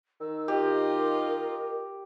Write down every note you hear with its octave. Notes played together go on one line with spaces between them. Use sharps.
D#3 E6
F4 G4 A#4 D#5